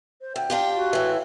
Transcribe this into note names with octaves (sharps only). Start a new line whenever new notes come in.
C5
D2 G5
D4 F4 G4
F#4
A2 E3